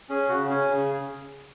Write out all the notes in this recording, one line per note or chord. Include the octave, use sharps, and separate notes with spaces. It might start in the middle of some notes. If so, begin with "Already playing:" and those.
C#4 G#4
C#3 F#4
C#4 G#4
C#3